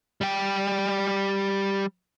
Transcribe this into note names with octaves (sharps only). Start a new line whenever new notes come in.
G3 G5